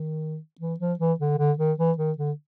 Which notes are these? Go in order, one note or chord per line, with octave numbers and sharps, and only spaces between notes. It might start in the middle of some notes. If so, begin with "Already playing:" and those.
Already playing: D#3
E3
F3
E3
D3
D3
D#3
E3
D#3
D3